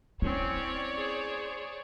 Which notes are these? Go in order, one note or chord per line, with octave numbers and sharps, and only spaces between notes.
C4 C#4 E4 C#5 D5
G#4 C5